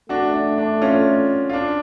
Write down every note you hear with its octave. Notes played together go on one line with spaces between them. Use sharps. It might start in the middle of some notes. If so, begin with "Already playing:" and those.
A3 D4 F#4
D4
D4
C#4 F4
F4
D4